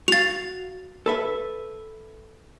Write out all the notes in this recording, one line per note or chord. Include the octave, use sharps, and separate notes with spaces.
F#4 F5 A6 F7
A4 B4 E5